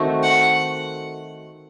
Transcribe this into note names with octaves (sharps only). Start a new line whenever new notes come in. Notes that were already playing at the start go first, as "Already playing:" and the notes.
Already playing: D#3 A3 C4 F#4
F#5